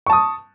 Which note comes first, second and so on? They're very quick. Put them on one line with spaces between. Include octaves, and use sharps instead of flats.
C#6 A5 D#6